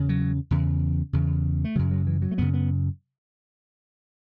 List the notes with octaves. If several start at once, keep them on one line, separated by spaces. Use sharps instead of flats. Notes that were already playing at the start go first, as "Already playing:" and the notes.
Already playing: E2 C#3
F#3
E2 C#3
E2 C#3
A3
F#2 C#3 F#3
F#3
E3
F#3
A3
F#2 C#3 B3
B3